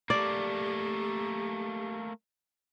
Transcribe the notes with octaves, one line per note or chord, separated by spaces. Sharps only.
A3 A#3 G4 D5